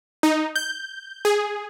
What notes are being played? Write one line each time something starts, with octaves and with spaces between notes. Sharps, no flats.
D#4
G6
G#4